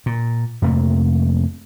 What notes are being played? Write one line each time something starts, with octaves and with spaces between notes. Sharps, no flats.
A#2
F2 C3 A3 A#3